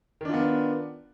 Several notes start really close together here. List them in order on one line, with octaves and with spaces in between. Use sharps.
D#3 D4 F4 B3